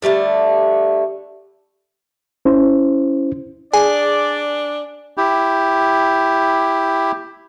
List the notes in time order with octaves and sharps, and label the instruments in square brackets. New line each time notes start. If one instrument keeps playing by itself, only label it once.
[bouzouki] D3 G3 A3 A5
[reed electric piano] C#4 E4 C5
[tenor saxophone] D4 [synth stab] G#4 [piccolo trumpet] D5 [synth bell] G#5
[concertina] E4 G4